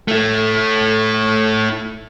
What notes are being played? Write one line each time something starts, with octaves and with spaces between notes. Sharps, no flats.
A3 E4